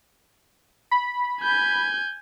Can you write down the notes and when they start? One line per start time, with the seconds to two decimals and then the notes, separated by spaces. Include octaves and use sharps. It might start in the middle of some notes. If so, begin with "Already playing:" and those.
0.91 B5
1.42 G#5 G6